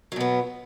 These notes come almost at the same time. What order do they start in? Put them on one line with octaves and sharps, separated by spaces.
F#3 B2 B3